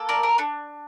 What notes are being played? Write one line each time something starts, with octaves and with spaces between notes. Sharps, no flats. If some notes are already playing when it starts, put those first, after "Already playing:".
Already playing: A#3 A4
A#4 D5
A#4
D4 A4